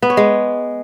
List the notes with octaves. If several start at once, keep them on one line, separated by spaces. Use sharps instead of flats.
B3
C#5
G#3